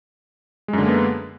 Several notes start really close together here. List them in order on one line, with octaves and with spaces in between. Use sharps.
G#3 F#2 D3 A#3 B3